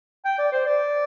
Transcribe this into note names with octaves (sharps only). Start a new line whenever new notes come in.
G5
D5
C5
D5